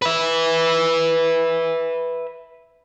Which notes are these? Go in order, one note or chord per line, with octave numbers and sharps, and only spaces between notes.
B4 E5